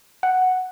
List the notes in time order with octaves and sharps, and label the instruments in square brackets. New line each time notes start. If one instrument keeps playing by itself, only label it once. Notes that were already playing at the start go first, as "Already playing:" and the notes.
[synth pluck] F#5